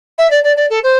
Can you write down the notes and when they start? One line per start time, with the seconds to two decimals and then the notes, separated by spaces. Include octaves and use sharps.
0.18 E5
0.30 D5
0.43 D5
0.56 D5
0.70 A4
0.83 C5